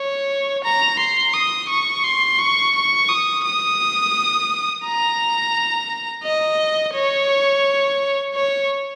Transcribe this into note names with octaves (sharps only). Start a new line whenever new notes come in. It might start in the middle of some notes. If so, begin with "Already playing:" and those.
Already playing: C#5
A#5
C6
D#6
C#6
C6
C#6
C#6
D#6
D#6
A#5
D#5
C#5
C#5